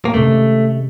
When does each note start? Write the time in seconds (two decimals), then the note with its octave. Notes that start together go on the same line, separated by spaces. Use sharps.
0.05 A#3
0.14 C3 D#3 G#3 A3 C#4